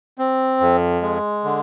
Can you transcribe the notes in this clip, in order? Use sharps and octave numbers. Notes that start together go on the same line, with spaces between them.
C4
F2
G#3
D3